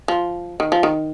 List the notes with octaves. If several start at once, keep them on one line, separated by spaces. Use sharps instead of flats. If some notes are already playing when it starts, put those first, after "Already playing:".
F3
D#3
F3
D#3